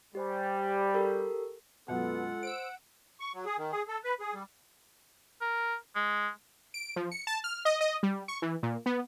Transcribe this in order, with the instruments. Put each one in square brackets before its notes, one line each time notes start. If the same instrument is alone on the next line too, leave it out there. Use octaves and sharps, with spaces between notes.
[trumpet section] G3 [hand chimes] G4 C5 G#5
[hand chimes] G4 A4 A#4
[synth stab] F#2 B2 [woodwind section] G#3 F4 A4 [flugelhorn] B3 [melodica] F#5
[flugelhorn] C5 [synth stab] E6 D7
[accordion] C#6
F#3
G#4
D#3
G#4
A4
B4
G#4
G3
[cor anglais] A#4
G#3
[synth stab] D7
F3
C#7
A5
F6
D#5
D#5
G3
C#6
E3
A#2
B3